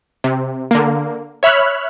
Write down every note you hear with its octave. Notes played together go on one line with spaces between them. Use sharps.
C3
D3 A#3
C#5 E5 B5 F6 F#6